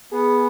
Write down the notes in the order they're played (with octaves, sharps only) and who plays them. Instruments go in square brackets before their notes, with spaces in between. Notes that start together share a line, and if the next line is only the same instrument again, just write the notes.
[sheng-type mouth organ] B3 [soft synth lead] G#4